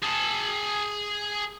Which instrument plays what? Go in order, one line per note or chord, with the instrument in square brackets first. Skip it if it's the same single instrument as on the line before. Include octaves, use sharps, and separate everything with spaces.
[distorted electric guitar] G#4 A5